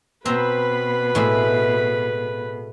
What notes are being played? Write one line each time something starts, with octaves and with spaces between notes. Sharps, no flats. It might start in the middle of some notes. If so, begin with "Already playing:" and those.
B2 C4 B4 A#5 B5
A2 G#3 A3